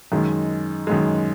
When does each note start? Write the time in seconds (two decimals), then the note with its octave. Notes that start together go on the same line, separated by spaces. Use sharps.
0.12 F#2 D#3 G#3
0.87 F#2 D#3 G#3